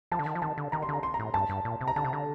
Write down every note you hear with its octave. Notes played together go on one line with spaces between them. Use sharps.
F3 A5
D3
D#3
F3
D#3 A5
D3
D#3 A#5
C6
D3 A#5
C6
A#5
A2
G2 A5
G2
A#2
C3
A#5
D3 A5
C3
D3